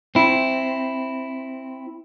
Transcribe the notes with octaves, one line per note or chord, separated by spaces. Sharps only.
C4 E4